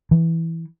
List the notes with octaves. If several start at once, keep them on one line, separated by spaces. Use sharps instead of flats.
E3